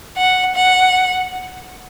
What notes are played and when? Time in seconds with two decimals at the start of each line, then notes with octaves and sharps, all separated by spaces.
0.17 F#5
0.55 F#5